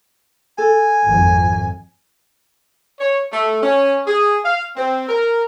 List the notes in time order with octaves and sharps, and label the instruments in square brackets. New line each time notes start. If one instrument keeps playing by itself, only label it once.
[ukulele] A4 [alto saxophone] G#5
[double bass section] G#1 F2
[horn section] C#5
A3
C#4
G#4
F5
C4
A#4